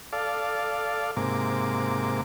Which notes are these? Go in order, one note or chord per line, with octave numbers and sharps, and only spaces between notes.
A4 D5 F5
G#2 C3 A#3 D6